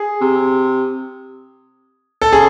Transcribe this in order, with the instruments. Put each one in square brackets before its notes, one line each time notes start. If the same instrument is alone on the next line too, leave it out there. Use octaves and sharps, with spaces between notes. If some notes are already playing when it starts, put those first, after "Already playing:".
Already playing: [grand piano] G#4
[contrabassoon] C3
[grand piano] A4
[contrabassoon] C#3 [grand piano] G#4